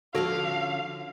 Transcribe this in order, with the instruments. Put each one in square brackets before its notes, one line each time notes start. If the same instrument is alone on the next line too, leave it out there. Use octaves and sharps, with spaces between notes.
[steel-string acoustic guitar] D3 F3 C#4 [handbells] F#4 A4 [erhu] F5